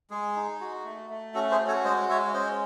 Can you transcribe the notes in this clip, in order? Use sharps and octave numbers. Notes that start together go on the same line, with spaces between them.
G#3 G#4
D#4
F#4
A3
A3
C#4 F#4 A4
G#4 C5
F#4
A4 C#5
G#3 C5 D#5
G#3 C#5 E5
C#4 C5 D#5